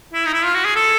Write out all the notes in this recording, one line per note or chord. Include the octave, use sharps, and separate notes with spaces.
E4
D#4
E4
F4
F#4
G#4
A4